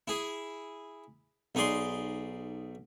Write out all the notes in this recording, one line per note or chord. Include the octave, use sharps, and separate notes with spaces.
E4 G#4
B1 D#4 G#4 D5 C6